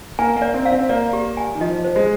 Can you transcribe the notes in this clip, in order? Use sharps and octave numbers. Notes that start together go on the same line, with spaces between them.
A#3 G#5
A#3
D5
C4
F5
C4
A#3 D5
G4
G#5
D#3
F3 D#5
C5
G#3